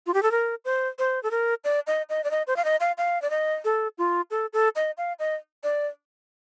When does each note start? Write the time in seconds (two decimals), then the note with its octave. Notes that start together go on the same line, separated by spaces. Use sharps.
0.07 F4
0.14 G4
0.23 A4
0.32 A#4
0.65 C5
0.99 C5
1.23 A4
1.31 A#4
1.64 D5
1.87 D#5
2.09 D#5
2.24 D5
2.31 D#5
2.47 C5
2.56 F5
2.65 D#5
2.80 F5
2.98 F5
3.22 D5
3.30 D#5
3.65 A4
3.98 F4
4.31 A4
4.53 A4
4.76 D#5
4.98 F5
5.19 D#5
5.64 D5